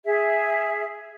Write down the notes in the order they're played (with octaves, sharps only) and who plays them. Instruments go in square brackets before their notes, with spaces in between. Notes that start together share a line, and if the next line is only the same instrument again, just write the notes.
[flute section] G#4 E5